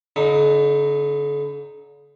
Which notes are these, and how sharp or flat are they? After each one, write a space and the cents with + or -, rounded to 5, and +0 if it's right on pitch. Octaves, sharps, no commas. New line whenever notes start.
D3 -45 D#4 +0